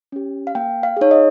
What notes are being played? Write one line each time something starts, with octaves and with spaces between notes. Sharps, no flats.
C#4 G4
F5
A#3 G5
F5
D#4 G#4 C#5
D#5